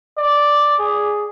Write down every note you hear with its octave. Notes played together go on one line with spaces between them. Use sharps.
D5
G#4